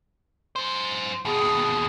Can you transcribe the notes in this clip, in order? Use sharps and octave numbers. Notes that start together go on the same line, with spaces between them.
F#2 C5
D#2 B2 G#4